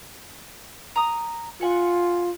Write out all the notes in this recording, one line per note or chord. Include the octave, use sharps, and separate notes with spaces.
A#5 D#6
F4 F#5 G#5